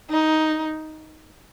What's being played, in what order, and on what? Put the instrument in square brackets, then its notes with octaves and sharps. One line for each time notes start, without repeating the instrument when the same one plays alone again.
[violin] D#4